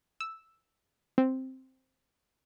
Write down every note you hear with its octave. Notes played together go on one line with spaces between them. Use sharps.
E6
C4